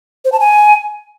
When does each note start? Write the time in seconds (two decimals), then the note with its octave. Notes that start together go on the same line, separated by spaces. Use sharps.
0.25 C5
0.32 A5
0.40 G#5